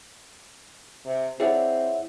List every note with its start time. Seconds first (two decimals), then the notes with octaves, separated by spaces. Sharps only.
1.06 C3
1.40 C4 E4 G#4 C#5 D5 E5 F#5